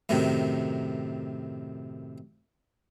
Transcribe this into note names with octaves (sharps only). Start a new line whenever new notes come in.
F#2 A2 C3 D#3